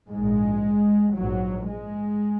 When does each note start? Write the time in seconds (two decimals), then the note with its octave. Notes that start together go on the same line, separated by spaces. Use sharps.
0.10 A#1 G#2 G#3
1.16 A#1 G#2 F#3
1.69 G#3